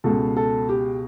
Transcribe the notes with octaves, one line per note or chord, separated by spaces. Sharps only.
C#2 B2 A4
A4
G4